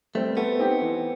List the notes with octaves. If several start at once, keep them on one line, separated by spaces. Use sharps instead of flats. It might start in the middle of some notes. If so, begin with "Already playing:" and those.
G3 A3 C4
A3 B3
C4 D#4 G4
E3